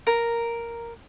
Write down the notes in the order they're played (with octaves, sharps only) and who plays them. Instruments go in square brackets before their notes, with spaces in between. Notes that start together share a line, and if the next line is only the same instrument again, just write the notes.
[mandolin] A#4